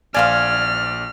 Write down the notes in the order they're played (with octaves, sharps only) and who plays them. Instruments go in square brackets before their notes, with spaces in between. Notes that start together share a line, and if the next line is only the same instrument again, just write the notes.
[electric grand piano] A#1 D5 [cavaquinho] C5 F5 G#5 [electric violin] F6